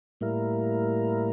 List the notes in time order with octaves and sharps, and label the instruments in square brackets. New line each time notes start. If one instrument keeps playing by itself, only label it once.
[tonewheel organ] A2 G3 A#3 E4 A#4